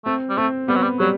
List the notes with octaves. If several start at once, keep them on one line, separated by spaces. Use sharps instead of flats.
A3 C4
G3
A3 C4
G3 B3
F#3
G3
F#3 G3